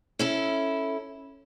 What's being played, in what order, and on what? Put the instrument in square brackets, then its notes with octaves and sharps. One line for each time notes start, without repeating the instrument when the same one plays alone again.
[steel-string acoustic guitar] C#4 E4 A4